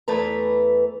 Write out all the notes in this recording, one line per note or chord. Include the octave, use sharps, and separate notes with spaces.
E2 E3 A3 B4 A#5